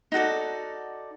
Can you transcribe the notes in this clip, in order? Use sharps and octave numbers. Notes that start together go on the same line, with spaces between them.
D#4 F#4 A4 D5